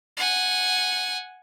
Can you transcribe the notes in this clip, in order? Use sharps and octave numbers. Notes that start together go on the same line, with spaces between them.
F#5 G#5